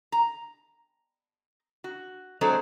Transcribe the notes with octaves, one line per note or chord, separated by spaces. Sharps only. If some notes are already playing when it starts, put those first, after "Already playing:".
A#5
F#4
F#3 G#3 C4 D4 A4 C5